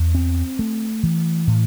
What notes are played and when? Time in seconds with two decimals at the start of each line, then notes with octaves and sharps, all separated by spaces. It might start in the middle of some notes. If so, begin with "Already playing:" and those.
Already playing: E2
0.15 C4
0.59 A3
1.03 E3
1.47 A2